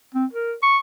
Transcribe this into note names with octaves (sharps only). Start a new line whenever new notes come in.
C4
A#4
C#6